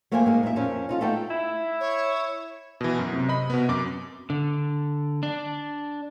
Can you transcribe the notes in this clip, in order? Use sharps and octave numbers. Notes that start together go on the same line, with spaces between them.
A3 A#3 F4 C5 G5 G#5
G#3 A#3 D#4
A#2 D#4 E4 E5
F2 C4 C#4 A#4 F5
D#4 F4 A4
A3 D#4 F4 A4 G5
E4
C#5
B2 E3
F#2
C3
D#5 B5
B2 B3
F#2 D6
D3
D4